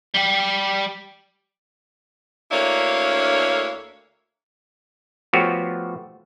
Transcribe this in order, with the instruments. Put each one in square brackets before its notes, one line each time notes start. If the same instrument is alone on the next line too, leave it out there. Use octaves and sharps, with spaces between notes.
[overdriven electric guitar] G3 G5
[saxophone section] D2 A#3 D4 E4 C#5 F5
[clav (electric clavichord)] F3 A3 B3 F#4 G4 C#5